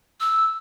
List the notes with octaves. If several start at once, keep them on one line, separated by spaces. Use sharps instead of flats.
E6